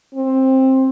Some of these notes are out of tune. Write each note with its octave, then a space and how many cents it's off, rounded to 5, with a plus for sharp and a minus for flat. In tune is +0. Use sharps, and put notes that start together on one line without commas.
C4 +15